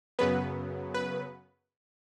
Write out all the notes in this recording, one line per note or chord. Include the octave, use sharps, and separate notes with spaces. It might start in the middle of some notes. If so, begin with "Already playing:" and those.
F#2 C#3 F#3 B3 B4
B4